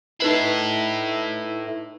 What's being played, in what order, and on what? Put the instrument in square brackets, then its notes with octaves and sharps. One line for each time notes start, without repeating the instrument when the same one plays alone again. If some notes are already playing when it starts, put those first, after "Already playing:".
[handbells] D#4 B4 C7 [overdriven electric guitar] E4 A4